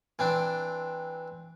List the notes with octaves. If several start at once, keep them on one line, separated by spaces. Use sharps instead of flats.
E3 C4 D4